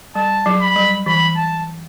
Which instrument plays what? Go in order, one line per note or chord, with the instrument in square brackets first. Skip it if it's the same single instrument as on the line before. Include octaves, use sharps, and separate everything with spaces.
[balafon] G3 [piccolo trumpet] A5
[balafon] F#3
[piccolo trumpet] B5
[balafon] G3
[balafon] E3 [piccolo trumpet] B5
[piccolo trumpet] A5